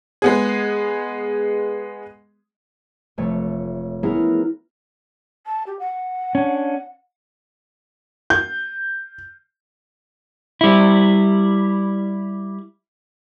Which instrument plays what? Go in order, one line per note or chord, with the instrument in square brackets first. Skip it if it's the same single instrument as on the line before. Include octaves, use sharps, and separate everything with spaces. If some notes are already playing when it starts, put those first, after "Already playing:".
[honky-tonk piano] G#3 B3 G#4
[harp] F1 A3 C#5
B3 C#4 E4 G#4 A#4
[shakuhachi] A5
G4
F#5
[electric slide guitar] C#4 D4
[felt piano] G6
[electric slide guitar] G3 E4